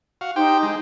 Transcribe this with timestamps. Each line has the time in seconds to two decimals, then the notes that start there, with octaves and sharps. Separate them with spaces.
0.21 F#4 F5
0.36 D#4 G4 C5 G5
0.63 G#3